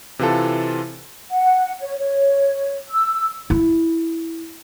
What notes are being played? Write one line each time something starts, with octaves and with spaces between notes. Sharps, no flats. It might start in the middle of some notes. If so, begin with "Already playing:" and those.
C3 E3 F4 A4
F#5
C#5
C#5
E6
E4